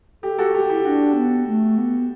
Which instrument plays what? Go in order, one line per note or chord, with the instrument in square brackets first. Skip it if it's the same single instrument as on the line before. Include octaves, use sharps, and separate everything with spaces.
[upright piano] G4 [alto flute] A4
[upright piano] F#4 A4 [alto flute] G4
[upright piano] G4
[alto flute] E4 [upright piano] G4
[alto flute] D4 [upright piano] F#4
[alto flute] B3
A3
B3